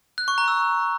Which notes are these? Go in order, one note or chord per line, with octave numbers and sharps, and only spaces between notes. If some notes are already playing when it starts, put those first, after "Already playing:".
F#6
C#6
A#5
E6